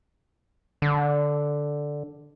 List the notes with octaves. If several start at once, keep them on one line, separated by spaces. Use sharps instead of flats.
D3